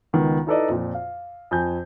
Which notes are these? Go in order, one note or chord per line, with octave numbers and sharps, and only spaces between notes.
C#2 D#3 B3
D#4 E4 A4 B4 D5 D#5
F2 A#2
F5
F2 G#5 G6